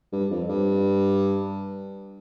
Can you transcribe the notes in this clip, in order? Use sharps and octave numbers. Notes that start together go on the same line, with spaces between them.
G2
F2
G2